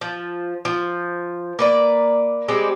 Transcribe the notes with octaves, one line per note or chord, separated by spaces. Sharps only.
F3
F3
A#3 B4 D5
G3 G#3 C4 G4